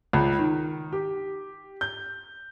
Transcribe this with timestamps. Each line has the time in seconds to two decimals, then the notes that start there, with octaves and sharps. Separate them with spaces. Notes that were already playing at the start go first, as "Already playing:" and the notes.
0.13 C#2
0.39 D#3
0.92 G4
1.81 G6